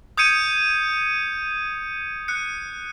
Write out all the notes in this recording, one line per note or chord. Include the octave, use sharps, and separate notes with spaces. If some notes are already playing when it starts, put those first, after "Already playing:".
D#6 G6 G#6 C#7 D#7
F#6 C#7